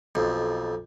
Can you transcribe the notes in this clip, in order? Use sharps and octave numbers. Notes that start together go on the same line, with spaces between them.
B1 F2